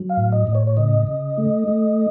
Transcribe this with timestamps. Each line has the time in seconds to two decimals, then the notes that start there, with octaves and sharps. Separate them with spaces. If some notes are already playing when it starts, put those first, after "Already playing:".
Already playing: F#3
0.09 F5
0.17 A2
0.32 D#5
0.47 A2
0.55 C#5
0.67 C#5
0.77 C#3 D#5
1.07 C#3
1.38 A3
1.68 A3